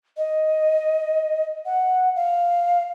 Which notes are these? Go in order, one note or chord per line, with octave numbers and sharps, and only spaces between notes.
D#5
F#5
F5